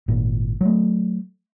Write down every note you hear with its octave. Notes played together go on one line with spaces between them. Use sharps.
G#1 A#2
F#3 A3